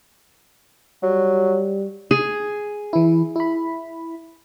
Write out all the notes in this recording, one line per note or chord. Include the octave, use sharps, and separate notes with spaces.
F#3 G3
G#4
E3 E4
E4 B5